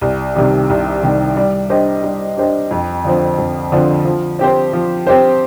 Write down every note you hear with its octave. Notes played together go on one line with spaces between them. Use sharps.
C2
C3 D#3 G3
C2
C3 D#3 G3
G3
D4 G4 C5 D#5
G3
D4 G4 C5 D#5
F2
D3 F3 C4
F2
D3 F3 C4
F3
C4 G4 C5
F3
C4 G4 C5